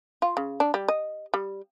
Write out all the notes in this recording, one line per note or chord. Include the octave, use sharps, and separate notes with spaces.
F4
C#3
D4
G3
D#5
G3